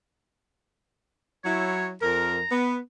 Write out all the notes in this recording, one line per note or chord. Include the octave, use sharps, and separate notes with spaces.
F#3 E4 C#5
F2 A#4 A#5
B3